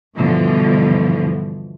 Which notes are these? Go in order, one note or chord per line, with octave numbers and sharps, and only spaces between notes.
G2 B2 D3 E3 F3